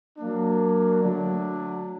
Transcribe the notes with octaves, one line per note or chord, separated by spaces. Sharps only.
F#3 A#3 D4
D3 F#3 A3 D4